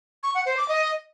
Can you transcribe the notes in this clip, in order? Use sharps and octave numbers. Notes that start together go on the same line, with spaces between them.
C#6
F#5
C5
D6
D#5